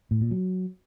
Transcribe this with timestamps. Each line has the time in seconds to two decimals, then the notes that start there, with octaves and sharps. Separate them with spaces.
0.11 A2
0.21 A#2
0.31 F#3